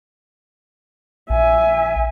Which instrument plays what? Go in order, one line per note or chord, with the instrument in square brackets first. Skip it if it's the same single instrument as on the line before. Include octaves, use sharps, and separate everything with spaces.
[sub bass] A#1 [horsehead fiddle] E5 G#5